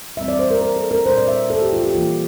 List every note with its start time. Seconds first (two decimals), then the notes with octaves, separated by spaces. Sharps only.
0.17 E3 G3 C4 E5
0.28 D5
0.39 C5
0.51 A#4
0.61 A#4
0.76 A4
0.91 A#4
1.06 A#2 G3 D4 C5
1.17 D5
1.28 E5
1.50 A4
1.62 G4
1.73 F4
1.84 G4
1.95 E3 G3 A#3 F4